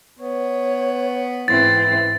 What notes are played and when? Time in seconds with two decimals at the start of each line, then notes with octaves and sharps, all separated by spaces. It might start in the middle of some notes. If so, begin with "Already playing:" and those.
0.19 B3 C#5
1.48 G#2 E3 C4 A6